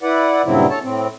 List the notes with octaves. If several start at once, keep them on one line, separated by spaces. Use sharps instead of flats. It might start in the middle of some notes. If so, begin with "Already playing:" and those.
E4 B4 D5 F#5
G2 A#2 C#3 F#3 C4 E4
A4 C#5 A5
A2 C4